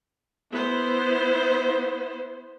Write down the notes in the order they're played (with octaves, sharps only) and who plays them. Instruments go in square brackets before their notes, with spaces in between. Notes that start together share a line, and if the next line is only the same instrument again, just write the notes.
[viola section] B3 E4 C5